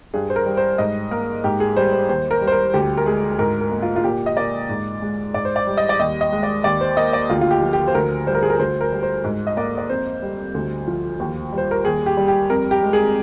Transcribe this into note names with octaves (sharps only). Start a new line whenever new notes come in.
G2 G#4
C5
A#4
G3
C5
G#2 D#5
A#3 A#4
G#2 G4
G#4
G3 C5
C5
D#2 C5
A#4
G3
C5
A#4
D2 G4
A#4
G#3 G#4
G#2 A#4
A#4
A#3
F4
F4
A#2 G4
D#5
A#3 D5
G#2
G#3
G#2 D5
C5
D5
G3
D#5
D5
D#2 D#5
D#5
G#3
D5
D#2 D5
C5
A#3 D#5
D5
D2 F4
F4
G4
F3
G4
C5
D2 A#4
G3 C5
A#4
G#4
A#4
D2 C5
A#4
G3
C5
G#2
D#5
A#3 D5
D5
F2 C5
G3
D2
F3
D#2
G3
C5
A#4
D#2 G#4
G4
G3
G4
F2 A#4
G4
G#3
G#4